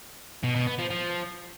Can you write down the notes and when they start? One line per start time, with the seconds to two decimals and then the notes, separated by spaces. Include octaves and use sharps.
0.43 B2
0.55 B2
0.67 B3
0.78 F3
0.90 F3